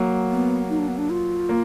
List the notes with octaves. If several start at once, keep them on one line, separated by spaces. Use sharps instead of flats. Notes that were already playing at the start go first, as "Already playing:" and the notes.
Already playing: F#3 A#3
B3
D#4
D4
B3
D4
F4
A#3